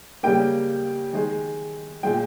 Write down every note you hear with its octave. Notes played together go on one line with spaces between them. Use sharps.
C#3 G3 A#3 G5
D#3 G#3
A#2 G#3 G5